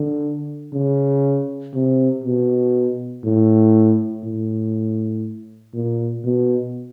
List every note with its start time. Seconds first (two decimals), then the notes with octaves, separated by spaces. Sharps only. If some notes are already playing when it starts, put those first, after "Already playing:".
Already playing: D3
0.74 C#3
1.74 C3
2.24 B2
3.24 A2
4.24 A2
5.74 A#2
6.25 B2